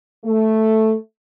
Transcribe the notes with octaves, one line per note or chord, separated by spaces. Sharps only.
A3